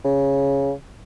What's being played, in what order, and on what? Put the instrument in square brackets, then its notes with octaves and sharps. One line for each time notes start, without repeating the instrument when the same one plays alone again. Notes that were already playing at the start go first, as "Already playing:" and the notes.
[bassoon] C#3